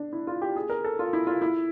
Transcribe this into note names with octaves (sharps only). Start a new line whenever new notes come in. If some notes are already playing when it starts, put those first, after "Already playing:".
Already playing: D4
E4
F4
G4
G#4
A#4
A4
F4
E4
F4
E4